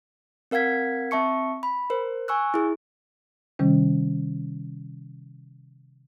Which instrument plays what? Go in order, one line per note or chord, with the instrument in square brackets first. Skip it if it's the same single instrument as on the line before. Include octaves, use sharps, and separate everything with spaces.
[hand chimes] C4 A#4 F5 F#5 G#6 B6
C4 E5 A5 C#6 C#7
B5
A#4 C5
G#5 C#6 E6 F#6
E4 G#4
[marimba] C3 D#3 G3 C#4